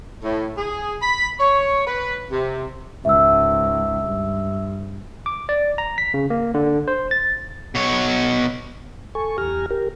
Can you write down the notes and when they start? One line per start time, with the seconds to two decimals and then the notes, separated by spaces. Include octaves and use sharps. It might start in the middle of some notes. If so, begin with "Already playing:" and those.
0.23 A2
0.58 G#4
1.02 B5
1.40 C#5
1.87 B4
2.31 C3
3.05 C#2 G#2 E5 E6
4.01 G2
5.26 D6
5.49 D5
5.78 A#5
5.98 B6
6.14 C#3
6.30 A#3
6.54 D3
6.88 C5
7.11 A6
7.75 B2 C#5
9.15 A4 G#5 C#6
9.38 E2 G4 G#5 A#5 F6
9.71 G4 A#4